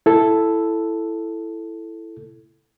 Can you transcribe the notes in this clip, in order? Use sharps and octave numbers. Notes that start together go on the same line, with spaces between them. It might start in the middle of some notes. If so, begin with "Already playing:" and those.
E4 A4